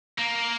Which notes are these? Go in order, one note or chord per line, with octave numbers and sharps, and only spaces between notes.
A#3